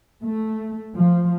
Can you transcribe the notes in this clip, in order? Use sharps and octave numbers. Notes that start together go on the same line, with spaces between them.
A3
F3